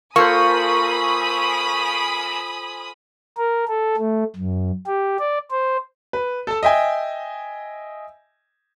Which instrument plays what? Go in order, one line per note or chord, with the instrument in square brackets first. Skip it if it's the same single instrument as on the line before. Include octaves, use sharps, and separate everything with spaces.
[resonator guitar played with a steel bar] A#3 [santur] F4 A4 C5 [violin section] G#5 B5 D#6 [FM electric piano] C#6
[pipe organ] A#4
A4
A3
F#2
G4
D5
C5
[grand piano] B4
A4 A5
D#5 E5 G5 G#5